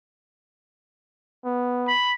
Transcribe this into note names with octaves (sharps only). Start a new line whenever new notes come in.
B3
B5